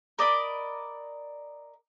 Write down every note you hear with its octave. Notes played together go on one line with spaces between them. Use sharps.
A#4 D5 D#5 B5